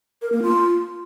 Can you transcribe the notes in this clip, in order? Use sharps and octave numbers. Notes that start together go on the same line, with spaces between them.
A#4
A#3
F4